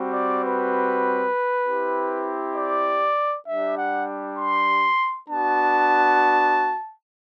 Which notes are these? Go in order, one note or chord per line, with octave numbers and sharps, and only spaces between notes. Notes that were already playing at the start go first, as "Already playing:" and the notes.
Already playing: G3 C4 F#4
D5
B4
C4 E4 G4
D5
G3 D4 G4 E5
F#5
C6
B3 D4 F#4 A5